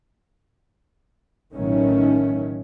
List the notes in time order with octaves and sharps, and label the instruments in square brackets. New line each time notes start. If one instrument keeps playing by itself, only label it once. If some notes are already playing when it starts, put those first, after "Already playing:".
[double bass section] A1 B2 D#3 F#3 A3 C#4